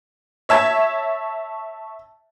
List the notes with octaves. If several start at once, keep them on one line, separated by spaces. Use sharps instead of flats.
C#5 E5 A5 G#6